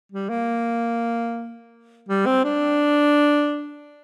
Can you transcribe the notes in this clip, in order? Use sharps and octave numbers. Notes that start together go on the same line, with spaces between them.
G3
A#3
G3
C4
D4